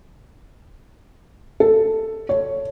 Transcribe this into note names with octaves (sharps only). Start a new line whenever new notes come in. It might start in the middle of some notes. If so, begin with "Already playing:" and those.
A4
C#5